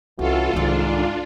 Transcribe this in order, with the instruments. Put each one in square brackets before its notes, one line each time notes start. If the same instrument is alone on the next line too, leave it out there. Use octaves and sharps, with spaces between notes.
[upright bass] C2 [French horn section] E3 C#4 F#4 [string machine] F4 A4
[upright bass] C2 D#3 [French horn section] G#2 [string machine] D4 F4